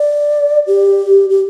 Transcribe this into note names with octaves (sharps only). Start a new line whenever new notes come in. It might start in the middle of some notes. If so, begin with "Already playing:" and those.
Already playing: D5
G4
G4